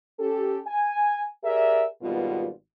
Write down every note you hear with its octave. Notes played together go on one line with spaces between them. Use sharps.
C#4 G4 A4
G#5
G4 G#4 A#4 D5 E5
G#1 B2 G3 B3 F4